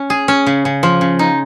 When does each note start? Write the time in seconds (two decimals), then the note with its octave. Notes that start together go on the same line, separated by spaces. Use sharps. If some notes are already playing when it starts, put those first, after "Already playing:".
Already playing: C#4
0.10 G#4
0.28 C#4
0.47 C#3
0.65 C#3
0.83 F3
1.01 C#3
1.19 D#4